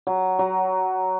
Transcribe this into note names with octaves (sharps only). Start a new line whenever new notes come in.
F#3
F#3